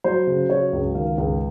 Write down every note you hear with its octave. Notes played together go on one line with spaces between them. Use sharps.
F#3 C5
C#3
F#3 C#5
C#2
D#3 F5
C#2